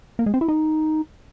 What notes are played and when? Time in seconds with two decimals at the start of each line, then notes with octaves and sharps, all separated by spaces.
0.19 A#3
0.26 G#3
0.34 C4
0.41 E4
0.48 D#4